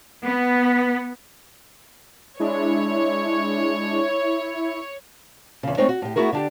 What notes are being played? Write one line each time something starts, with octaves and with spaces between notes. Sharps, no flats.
B3
G#3 D4 E4 C#5
E2 C#3
G#3 A3 C4 D#4 A4 C#5
F#4
A2 G4
A3 B3 E4 F#4 G#4 A#4
D3 D4 G4